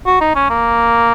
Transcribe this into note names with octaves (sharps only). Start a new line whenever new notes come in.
F#4
D#4
C#4
A#3